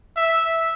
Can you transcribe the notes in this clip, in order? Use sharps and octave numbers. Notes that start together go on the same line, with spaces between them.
E5